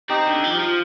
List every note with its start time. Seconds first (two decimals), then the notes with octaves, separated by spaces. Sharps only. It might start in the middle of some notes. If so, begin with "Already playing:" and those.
0.09 C4 D#4 G4
0.26 D3
0.44 F3
0.60 F3